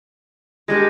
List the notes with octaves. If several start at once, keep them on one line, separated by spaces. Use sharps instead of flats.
G3 G#3 D4 G4 A#4